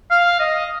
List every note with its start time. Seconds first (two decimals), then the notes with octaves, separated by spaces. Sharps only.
0.11 F5
0.39 D#5